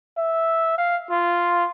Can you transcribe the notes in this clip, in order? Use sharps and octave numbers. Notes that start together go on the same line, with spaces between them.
E5
F5
F4